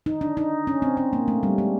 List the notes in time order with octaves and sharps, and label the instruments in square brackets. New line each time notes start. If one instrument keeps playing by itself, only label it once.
[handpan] D#4
D4
D#4
C#4
C4
C#4
A#3
A3
G3
G#3